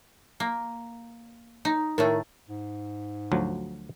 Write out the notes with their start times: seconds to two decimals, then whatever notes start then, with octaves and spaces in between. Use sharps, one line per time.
0.40 A#3
1.65 D#4
1.98 A2 D#3 A3 A#4 C#5
2.48 G#2
3.32 D2 F3 F#3